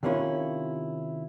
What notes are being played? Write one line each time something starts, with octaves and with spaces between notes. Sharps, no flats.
C3 D#3 A#3 C#4 E4 F4